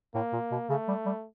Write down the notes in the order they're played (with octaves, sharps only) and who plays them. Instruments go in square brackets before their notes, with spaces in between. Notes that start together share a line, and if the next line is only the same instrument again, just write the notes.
[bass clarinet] A2 [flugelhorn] A#3
[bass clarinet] A#2
B2
[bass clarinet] C#3 [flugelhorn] A3
[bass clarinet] G3
G3